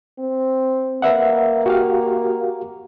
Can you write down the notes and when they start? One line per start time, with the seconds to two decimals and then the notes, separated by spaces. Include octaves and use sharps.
0.19 C4
1.02 A#3 B4 E5 F#5
1.66 F#4 G4 F5